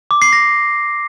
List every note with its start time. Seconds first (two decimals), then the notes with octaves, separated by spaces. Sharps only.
0.11 D6
0.22 C7
0.33 A#6